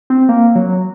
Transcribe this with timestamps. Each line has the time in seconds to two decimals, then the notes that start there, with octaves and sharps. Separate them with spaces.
0.10 C4
0.29 A#3
0.55 F#3